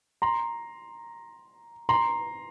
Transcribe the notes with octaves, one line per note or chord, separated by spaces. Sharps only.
A#5 C6
A#5 C6